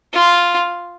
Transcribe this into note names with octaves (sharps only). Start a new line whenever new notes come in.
F4